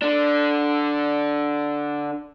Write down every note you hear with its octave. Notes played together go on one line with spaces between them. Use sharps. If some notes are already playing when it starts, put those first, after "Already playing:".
D3 D4